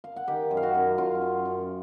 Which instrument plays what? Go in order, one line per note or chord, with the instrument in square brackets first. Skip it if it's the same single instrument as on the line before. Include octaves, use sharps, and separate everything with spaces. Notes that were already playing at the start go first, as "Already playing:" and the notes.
[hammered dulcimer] F5
F#5
D#3 G4 G5
F#2
F5
F#4 F#5
F#2
F#2 F4 F5
F#2
F#2